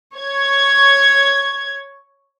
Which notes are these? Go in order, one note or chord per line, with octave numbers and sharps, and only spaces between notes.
C#5 G#6